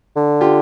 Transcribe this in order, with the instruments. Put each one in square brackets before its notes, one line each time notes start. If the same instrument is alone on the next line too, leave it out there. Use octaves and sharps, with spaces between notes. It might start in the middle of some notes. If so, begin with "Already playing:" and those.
[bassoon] D3
[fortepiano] F4 G4